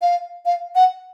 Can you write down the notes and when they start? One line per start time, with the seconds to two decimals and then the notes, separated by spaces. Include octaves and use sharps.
0.02 F5
0.46 F5
0.75 F#5